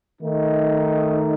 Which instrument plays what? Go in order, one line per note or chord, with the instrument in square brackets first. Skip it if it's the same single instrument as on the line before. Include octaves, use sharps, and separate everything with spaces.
[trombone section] D#3 A3 D#4